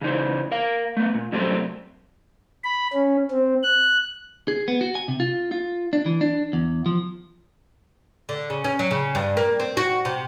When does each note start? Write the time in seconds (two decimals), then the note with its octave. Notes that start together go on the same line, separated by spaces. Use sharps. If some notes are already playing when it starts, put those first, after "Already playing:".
0.01 C#3 E3 D#4 C5
0.51 A#4 F5
0.97 A3 B3
1.14 A#2
1.32 F#2 C3 F#3 G3 A3 C4
2.64 B5
2.93 C#4
3.31 C4
3.63 F#6
4.48 G#4
4.68 B3
4.81 F#4
4.95 G#5
5.08 C3
5.20 F4
5.52 F4
5.93 D4
6.06 E3
6.21 D4
6.53 E2
6.86 F3
8.29 D3
8.50 C#3
8.64 C#4
8.79 F#3
8.91 C#3
9.15 G2
9.37 A#3
9.60 C4
9.77 F#4
10.05 C3